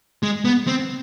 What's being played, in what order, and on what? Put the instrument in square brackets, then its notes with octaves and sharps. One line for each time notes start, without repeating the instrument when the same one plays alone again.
[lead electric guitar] G#3
B3
C4